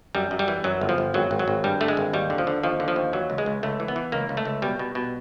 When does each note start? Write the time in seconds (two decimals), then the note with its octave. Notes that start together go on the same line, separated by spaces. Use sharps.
0.15 F#2 G3
0.31 F#2
0.39 G3
0.48 E3
0.64 F#2 F#3
0.81 G1
0.89 F3
0.98 G1
1.14 G#1 F#3
1.31 G#1
1.39 F#3
1.48 G#1
1.64 G2 G3
1.81 D3 A3
1.88 G#3
1.97 G#1
2.13 D#2 G3
2.30 D3
2.38 F3
2.47 D3
2.63 D#2 F3
2.80 D3
2.88 F3
2.96 D#2
3.13 E3 F#3
3.30 C#2
3.38 G#3
3.46 C#2
3.63 C#2 A3
3.80 E3
3.88 B3
3.96 E3
4.12 C#2 A#3
4.29 C#2
4.37 A3
4.45 C#2
4.62 B2 G3
4.79 B2
4.95 B2